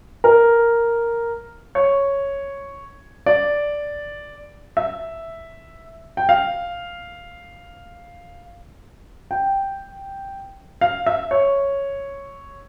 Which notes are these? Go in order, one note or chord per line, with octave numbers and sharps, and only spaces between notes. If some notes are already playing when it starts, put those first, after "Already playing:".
A#4
C#5
D5
E5
G5
F5
G5
F5
E5
C#5